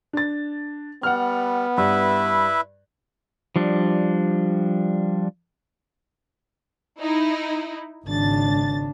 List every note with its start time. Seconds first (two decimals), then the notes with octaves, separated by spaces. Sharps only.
0.13 D4 A6
1.03 G3 B3 F#5 F6
1.77 G2 E4 B4 E5
3.56 F3 G3 D4
7.00 D#4 E4
8.06 G#1 C#3 D4 A6